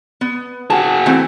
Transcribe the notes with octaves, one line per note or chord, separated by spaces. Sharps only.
B3
F#4 G#4 A5
E3 A3 C4